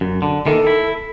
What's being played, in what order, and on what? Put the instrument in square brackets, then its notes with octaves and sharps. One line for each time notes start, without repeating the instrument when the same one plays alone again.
[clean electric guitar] F#2
D3
[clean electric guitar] D#3 E3 A#3 [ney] A4
[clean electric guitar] E4